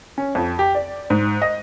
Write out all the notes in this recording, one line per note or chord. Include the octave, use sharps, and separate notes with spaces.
C#4
F2
G4
D5
G#2
D#5